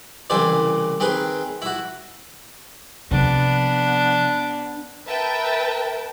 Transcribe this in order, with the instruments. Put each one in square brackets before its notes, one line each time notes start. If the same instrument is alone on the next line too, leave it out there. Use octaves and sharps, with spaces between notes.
[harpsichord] C2 C#3 E3 E4 C5 D5
D#3 C4 G#4 B4
E4 F#4
[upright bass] C3 F3 [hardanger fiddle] B3 D4
[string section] A#4 B4 E5 G5 A5